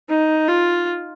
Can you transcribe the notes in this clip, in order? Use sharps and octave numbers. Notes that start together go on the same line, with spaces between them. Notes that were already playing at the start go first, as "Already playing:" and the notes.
D#4
F4